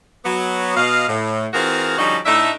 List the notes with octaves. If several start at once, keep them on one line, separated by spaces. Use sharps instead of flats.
F#3 B3
B2 D#5 F5
A2
E3 C4 F4 F#4 G#4 A#4
D3 F3 G3 C#4 D#4 F#4
A2 A3 D4 D#4 E5